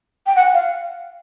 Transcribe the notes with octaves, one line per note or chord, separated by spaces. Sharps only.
G5
F#5
F5